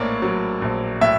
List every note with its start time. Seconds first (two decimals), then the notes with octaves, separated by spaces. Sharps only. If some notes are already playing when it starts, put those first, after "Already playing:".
Already playing: A#1 A2 A#3 C#5 D5
0.22 F#3
0.62 A#1
1.01 A2 E5